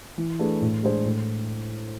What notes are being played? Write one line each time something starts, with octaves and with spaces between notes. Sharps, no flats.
E3
A3 D4 G#4 B4
A2
G#3 D4 G#4 C5
A2